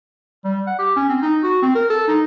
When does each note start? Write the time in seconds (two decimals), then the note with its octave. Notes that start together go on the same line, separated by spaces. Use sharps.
0.45 G3
0.67 F#5
0.79 G4
0.96 C#4
1.10 C4
1.22 D#4
1.43 F#4
1.62 C4
1.75 A#4
1.90 A4
2.08 D#4